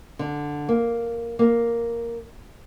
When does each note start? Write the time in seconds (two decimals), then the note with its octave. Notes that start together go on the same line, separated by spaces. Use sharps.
0.19 D3
0.69 A#3
1.39 A#3